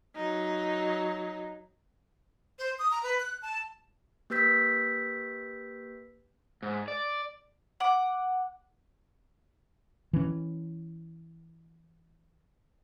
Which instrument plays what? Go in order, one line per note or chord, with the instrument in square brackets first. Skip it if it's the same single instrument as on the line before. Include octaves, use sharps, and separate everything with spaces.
[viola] F#3 D#4
[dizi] C5
D#6
A#5
B4
F#6
A5
[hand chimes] A#3 G4 B4 E6 G6 B6
[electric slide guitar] G#2
D5
[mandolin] F#5 D6
[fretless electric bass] E3 C#4